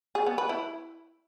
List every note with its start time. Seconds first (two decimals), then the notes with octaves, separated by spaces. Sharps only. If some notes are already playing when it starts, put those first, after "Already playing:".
0.15 G#4
0.27 B3
0.38 B4
0.49 E4